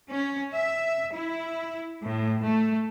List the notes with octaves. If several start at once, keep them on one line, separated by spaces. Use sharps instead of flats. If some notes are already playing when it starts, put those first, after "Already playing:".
C#4
E5
E4
A2
A3